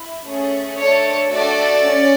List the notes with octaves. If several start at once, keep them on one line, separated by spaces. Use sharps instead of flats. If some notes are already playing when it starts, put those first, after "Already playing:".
Already playing: E4
A3 C#4 G#4
A3 D4 A4 C#5
A3 D4 F#4 A4 D5
C#4